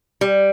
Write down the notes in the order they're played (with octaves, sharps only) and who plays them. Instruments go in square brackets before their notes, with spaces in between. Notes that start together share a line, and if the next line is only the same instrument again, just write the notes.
[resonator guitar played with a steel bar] G3